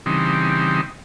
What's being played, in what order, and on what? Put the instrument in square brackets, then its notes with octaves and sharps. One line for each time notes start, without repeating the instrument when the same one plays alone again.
[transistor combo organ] C#3 E3 G3 C4 D#4